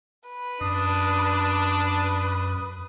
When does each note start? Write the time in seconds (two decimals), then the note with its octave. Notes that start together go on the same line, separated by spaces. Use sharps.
0.28 B4
0.61 F#2 D4 D#6
1.82 B4